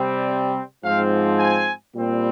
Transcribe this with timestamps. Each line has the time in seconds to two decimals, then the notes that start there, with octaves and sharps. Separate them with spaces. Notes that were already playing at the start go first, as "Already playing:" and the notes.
Already playing: C3 G3 C4
0.83 G#2 F3 C4 F5
1.39 G#5
1.94 A#2 G3 C4